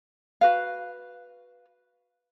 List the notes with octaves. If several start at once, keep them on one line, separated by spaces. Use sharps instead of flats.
F#4 B4 F5